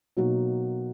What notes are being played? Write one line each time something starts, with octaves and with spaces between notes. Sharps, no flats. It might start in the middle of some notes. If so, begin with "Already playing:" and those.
B2 F#3 A#3 D#4 F#4